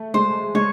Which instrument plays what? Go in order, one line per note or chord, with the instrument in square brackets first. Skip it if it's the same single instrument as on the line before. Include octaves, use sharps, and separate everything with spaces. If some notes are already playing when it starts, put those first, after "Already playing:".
Already playing: [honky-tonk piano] A3
[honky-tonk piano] G#3 [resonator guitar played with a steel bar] C5
[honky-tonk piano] G#3 [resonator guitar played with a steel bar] C#5